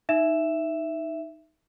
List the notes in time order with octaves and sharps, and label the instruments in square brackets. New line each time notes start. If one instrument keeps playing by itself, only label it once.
[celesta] D#4 E5 E7